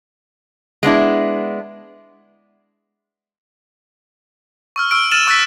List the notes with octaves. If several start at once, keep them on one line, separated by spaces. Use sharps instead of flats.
G#3 B3 D4 E4
C#6 E6 F6
C#6 E6 F6 D7
F6 A6 D#7 E7 F#7
C#6 E6 F#6 A6 B6